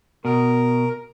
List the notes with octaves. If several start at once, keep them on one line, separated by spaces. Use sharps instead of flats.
B2 A#4